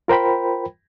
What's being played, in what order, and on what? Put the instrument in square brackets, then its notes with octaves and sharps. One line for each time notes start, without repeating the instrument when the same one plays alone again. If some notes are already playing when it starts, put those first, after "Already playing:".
[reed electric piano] F4 A#4 C5 G5 B5